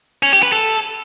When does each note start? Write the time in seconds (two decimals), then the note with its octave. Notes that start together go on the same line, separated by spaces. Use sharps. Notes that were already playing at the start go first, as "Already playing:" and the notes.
0.23 C#4
0.33 G4
0.42 B4
0.52 A4